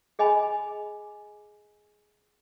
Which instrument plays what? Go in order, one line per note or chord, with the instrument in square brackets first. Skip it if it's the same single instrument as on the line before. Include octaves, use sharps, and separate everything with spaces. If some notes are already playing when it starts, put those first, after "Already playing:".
[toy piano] G#4 D#5 G#5 B5